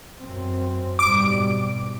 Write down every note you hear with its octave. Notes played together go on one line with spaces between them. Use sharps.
F#2 C4
G#2 B2 G3 D6 D7